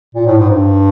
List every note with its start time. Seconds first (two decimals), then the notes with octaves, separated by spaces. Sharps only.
0.15 A#2
0.26 A2
0.38 G#2
0.50 G2